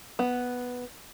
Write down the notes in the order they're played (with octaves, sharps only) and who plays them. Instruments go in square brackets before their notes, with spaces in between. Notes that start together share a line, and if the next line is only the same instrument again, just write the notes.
[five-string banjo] B3